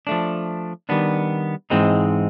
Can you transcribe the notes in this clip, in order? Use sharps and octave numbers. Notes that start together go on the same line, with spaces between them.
F3 A3 D4
D#3 G3 B3 D4
G#2 E3 G#3 C4 D#4